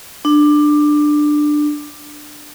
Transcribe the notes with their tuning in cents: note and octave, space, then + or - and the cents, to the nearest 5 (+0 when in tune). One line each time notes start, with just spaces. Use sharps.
D4 +15